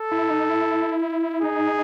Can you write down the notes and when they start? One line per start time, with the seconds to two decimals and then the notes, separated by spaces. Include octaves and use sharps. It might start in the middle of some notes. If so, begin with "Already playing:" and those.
Already playing: A4
0.12 E4
0.30 D#4
0.49 E4
1.43 D#4 G#4